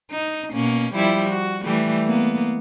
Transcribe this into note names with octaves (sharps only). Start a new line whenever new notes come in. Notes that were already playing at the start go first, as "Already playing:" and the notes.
D#4
B2 A#3 C#4
F3 G3 E4
F#4
E3 G3 A3
A#3 B3